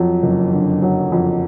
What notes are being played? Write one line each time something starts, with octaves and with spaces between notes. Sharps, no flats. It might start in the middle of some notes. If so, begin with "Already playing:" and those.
Already playing: F2 F#3
F#1
D3
F#3
F2